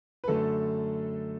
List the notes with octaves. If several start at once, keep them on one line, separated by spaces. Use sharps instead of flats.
B4
F#2 D3 A3 A4